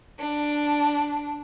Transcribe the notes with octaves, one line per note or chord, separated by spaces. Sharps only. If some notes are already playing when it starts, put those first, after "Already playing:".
D4